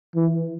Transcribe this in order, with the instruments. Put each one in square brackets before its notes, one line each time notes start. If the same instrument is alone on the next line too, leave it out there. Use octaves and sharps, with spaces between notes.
[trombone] E3